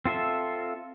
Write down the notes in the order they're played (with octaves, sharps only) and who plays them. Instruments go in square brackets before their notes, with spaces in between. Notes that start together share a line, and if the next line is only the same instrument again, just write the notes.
[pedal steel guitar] C4 F4 A4 E5